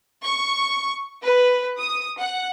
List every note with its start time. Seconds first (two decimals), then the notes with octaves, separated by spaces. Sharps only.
0.24 C#6
1.23 B4
1.78 D#6
2.19 F#5